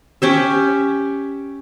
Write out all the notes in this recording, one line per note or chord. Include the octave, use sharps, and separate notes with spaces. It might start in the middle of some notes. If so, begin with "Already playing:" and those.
C#4 G4 E5